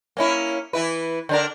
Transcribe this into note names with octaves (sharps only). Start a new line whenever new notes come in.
A#3 C#4 E4
E3 E4 B4
D3 D4 A#4